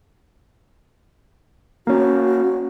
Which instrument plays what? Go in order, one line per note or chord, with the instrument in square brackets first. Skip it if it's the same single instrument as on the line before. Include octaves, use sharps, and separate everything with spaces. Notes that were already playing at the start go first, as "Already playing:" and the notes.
[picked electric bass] A#3 C#4 [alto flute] F#4